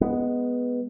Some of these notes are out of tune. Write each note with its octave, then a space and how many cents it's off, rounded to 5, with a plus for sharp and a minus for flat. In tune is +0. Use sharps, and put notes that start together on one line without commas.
G#3 +0 B3 +0